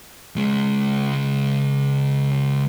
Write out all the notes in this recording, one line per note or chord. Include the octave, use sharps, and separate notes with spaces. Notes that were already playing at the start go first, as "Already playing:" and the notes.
C#2 G#3